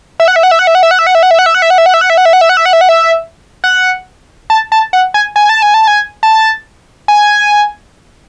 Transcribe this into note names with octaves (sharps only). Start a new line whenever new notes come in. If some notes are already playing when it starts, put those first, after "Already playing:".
E5
F#5
E5
F#5
E5
F#5
E5
F#5
E5
F#5
E5
F#5
E5
F#5
E5
F#5
E5
F#5
E5
F#5
E5
F#5
E5
F#5
E5
F#5
E5
F#5
E5
F#5
E5
F#5
E5
F#5
E5
F#5
A5
A5
F#5
G#5
G#5
A5
G#5
A5
G#5
A5
G#5